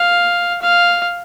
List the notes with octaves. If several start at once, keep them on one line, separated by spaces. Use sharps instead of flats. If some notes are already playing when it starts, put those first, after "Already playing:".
Already playing: F5
F5